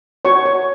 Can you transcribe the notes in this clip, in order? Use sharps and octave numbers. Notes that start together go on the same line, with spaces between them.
F#4 C#5 C#6
C#5